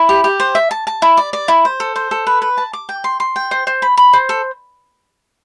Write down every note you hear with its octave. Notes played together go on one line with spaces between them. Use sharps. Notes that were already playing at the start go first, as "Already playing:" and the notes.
Already playing: E4
G4
G4
C5
E5
A5
A5
E4
D5
D5
E4
C5
A4
C5
A4
B4
B4
A5
D6
G5
C6
C6
G5
C5
C5
B5
B5
C5
A4